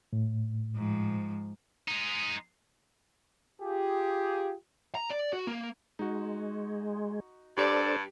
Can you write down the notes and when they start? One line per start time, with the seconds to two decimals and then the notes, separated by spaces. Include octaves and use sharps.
0.13 A2
0.76 G#2 F3
1.88 G#3 D#4
3.61 F4 G4 G#4
4.95 A#5
5.10 D5
5.33 F#4
5.47 A#3
5.99 G#3 D#4 F#4
7.57 G2 D4 G4 A4 C5 D5